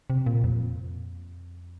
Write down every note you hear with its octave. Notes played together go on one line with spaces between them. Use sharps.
C3
A#2
F2